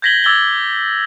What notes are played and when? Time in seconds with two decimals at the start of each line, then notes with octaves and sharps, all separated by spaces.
0.02 G6 G#6 A#6 B6 F#7 G7
0.24 D6 E6 G#6 A6 G7